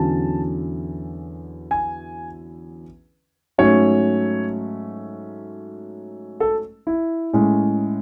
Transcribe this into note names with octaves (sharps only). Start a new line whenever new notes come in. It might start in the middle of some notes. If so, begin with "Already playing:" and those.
Already playing: E2 D3 F#3 C#4 A5
G#5
G#2 F#3 A3 C#4 C#5
A4
E4
A2 G#3 C#4